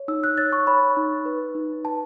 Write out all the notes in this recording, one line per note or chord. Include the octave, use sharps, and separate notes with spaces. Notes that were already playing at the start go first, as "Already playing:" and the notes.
Already playing: C#5
D#4 E6
F#6
C#5 A6
C#6
C#5 B5
D#4
B4
D#4
B4 A5